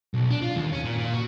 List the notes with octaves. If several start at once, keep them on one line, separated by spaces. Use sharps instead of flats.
B1
D4
F4
D#2
C#4
A#2
A#2
F#4